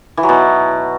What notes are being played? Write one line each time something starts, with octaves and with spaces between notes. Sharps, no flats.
E3
F#3
B2